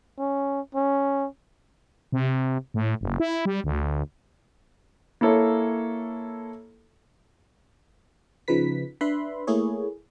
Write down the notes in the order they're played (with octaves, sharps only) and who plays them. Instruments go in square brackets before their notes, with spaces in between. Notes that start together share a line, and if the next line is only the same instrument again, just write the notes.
[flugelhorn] C#4
C#4
[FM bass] C3
A2
F#1
E4
G3
D2
[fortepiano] A#3 E4 A4 C#5
[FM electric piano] C#3 F3 D#4 B4 B6
D4 B4 E5 B5 C6
A3 A#3 E4 G#4 C#5